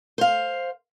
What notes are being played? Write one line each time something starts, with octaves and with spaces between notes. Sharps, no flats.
C5 F5